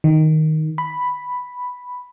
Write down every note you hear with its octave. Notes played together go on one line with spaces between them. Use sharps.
D#3
B5